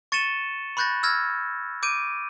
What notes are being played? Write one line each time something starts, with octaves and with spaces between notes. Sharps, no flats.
C#6 A6 C#7 D#7 E7 G7
B5 C#6 F#6 G6 A6 A#6
E6 F6 G#6 A#6
D6 G6 D7 D#7